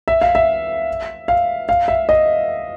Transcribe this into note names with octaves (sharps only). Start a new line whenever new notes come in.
E5
F5
E5
F5
F5
E5
D#5